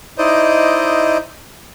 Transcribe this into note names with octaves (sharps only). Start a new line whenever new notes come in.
D#4 E4 C5 D5 D#5